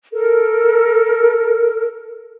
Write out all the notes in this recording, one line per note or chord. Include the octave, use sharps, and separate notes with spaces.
A4 A#4